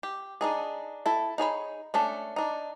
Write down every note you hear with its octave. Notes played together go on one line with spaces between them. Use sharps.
G4
D4 D#4 G#4
E4 A4
D#4 G#4 C#5 B5
A3 C#4 D4 A4
D4 D#4